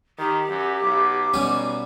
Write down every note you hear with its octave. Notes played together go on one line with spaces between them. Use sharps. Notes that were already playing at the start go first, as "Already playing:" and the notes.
D#3 G4
F#2
B1 D6
B1 B2 G3 C#4